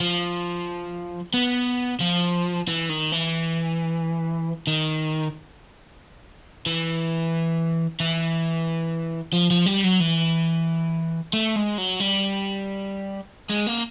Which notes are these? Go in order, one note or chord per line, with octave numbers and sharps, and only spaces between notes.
F3
B3
F3
E3
D#3
E3
D#3
E3
E3
F3
F3
G3
F#3
E3
A3
G#3
F#3
G3
G#3
A#3